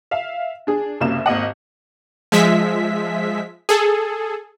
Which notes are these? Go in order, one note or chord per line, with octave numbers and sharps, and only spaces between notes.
E5 F5
D4 G#4
F#1 C2 F#2 A#3 E5 E7
G#1 D#2 D#5 F#5
F3 G#3 E5 B6
G#4 A4